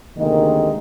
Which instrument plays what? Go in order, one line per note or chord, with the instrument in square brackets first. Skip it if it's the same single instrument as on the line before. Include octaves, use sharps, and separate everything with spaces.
[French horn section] D2 C3 D#3 G#3 A#3 D#5